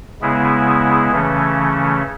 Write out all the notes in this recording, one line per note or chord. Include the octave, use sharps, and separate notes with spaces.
C#3 G#3 B3 E4 G#4
C#3 E3 A3 C#4